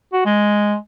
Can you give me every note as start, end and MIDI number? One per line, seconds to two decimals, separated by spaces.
0.13 0.21 66
0.25 0.76 56